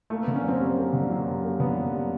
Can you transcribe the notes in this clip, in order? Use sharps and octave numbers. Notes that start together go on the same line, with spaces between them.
A3 A#3
D3 B3
C#4
F#2 C4
G3
A#3
D3
F#2
G3
A#3
D3 B3
F#2
G3